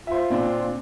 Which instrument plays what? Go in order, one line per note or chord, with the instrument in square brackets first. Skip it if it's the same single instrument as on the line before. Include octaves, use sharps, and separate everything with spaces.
[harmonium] F4 [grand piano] C5 E5
[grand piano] A#2 C4 D4